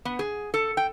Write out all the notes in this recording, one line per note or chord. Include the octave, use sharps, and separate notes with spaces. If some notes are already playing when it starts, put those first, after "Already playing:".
B3
G#4
A4
G5